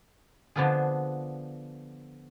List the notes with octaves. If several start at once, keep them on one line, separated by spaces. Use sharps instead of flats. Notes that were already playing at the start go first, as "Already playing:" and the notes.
D3 F3 B3 D4 F4 G#4